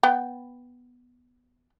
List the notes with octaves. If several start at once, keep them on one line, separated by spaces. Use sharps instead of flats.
B3 G5